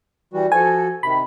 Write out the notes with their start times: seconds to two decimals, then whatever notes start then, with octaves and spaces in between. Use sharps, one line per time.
0.33 E3 G3 F#4
0.52 F3 F#4 A4 G#5
1.03 C3 D#3 B5